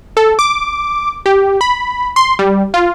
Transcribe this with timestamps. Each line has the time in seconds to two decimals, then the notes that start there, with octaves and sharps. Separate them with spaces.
0.17 A4
0.39 D6
1.26 G4
1.61 B5
2.16 C6
2.39 G3
2.74 F4